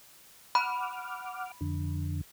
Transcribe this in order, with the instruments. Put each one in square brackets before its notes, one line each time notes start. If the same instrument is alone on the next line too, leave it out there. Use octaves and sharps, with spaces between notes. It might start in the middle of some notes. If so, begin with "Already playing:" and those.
[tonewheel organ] F#5 D6 F6 [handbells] B5
[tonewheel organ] F2 D3